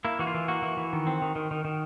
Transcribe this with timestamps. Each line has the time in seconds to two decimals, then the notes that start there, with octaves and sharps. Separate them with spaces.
0.05 A#3 E4
0.19 E3 F#4
0.27 F4
0.34 E3
0.48 A#3 F#4
0.62 E3
0.77 E3
0.93 D#3
1.07 C4
1.22 D#3
1.36 D#3
1.51 D#3
1.65 D#3